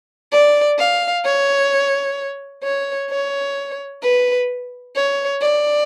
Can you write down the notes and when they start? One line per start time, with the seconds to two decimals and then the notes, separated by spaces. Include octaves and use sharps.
0.32 D5
0.79 F5
1.25 C#5
2.63 C#5
3.10 C#5
4.03 B4
4.96 C#5
5.41 D5